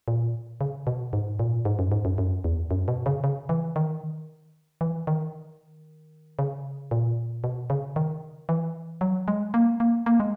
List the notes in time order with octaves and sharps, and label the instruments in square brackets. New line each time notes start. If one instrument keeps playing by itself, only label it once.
[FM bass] A#2
C#3
B2
G#2
A#2
G#2
F#2
G#2
F#2
F#2
E2
F#2
B2
C#3
C#3
E3
D#3
E3
D#3
C#3
A#2
B2
C#3
D#3
E3
F#3
G#3
A#3
A#3
A#3
G#3